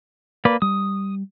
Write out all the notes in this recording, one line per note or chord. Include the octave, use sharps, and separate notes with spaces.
A#3 B4 D5
G3 D#6